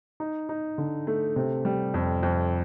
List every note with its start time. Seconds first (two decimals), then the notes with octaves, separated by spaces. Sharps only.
0.20 D#4
0.49 D#4
0.78 D3
1.07 A3
1.36 C3
1.65 G3
1.94 F2
2.23 F2